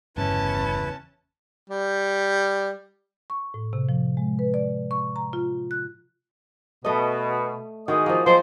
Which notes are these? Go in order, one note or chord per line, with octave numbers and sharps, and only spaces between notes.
G1 E2 C#3 C#4 E4 B4 A5
G3
C#6
A2
C3
F3
G#3
B4
D5
C#6
A#5
F4
F#6
B2 A3 D#5
D#3 G#3 E4 F#4 G#4 D#5
F3 A#3
F3 G#3 C5